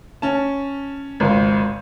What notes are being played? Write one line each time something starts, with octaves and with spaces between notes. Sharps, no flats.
C#4 A5
G#1 C#2